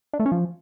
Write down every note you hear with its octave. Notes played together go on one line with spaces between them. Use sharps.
D4
A3
C#4
F3